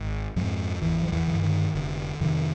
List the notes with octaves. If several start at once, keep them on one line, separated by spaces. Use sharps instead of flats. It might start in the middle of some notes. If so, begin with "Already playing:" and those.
Already playing: G#1
F2 G#2 F3
G#1 E2 E3
F3
E2 E3
G2 D3
D#3
F1 D3
F2 C3 D#3